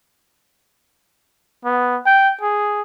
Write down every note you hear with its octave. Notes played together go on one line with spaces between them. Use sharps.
B3
G5
G#4